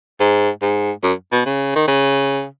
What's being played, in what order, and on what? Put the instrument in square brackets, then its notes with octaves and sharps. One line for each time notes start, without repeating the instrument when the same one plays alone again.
[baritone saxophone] G#2
G#2
F#2
B2
C#3
D#3
C#3